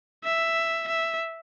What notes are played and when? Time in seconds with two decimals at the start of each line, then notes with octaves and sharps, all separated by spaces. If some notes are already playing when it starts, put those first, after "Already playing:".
0.24 E5
0.88 E5